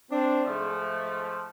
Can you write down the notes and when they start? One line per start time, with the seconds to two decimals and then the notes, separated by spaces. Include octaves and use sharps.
0.10 C4 D4
0.42 G#2 F3 A3